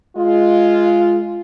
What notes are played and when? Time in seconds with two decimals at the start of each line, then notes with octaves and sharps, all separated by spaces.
0.16 G#3 F4